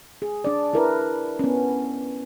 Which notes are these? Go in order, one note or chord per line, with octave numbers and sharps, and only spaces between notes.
G#4
D4 D5
E4 A#4 B4
B3 C#4